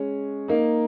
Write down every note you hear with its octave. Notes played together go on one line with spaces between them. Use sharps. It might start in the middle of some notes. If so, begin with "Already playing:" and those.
Already playing: G#3 C#4
A#3 D#4